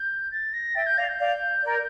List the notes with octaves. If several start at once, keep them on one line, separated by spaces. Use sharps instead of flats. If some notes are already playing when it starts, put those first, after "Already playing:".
Already playing: G6
A6
A#6
E5 G5 A6
G6
D5 F5 A#6
A6
G6
D5 F5
A#4 D5